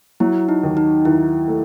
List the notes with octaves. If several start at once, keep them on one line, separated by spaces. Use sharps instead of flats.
F#3 E4
D#4
D#2
D#4
D#2 E4
A3